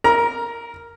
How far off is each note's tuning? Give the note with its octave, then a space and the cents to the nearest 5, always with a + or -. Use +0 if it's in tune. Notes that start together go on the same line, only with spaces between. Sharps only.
A#4 -10 A#5 +20